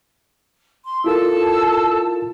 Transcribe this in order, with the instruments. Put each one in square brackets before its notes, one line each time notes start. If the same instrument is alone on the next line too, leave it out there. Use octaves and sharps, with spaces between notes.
[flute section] C6
[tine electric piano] E4 F4 A#4 [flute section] A4 A5 E6